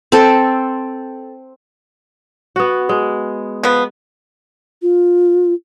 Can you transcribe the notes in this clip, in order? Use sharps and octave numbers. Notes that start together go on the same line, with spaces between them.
C4 A4
B3 F#4
G#3
F3 B3
F4